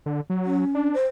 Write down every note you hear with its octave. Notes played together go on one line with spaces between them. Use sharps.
D3
F#3
C#4
D4
C5